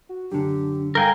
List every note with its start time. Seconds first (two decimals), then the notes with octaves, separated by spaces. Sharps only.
0.09 F#4
0.32 F#2 D3 D4 G4
0.95 G2 A4 A#4 F5 G5 G#5 A#5